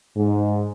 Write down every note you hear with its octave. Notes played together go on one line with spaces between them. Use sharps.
G#2